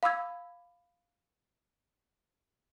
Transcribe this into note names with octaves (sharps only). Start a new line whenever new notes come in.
F5 B5 D6 E6 G#6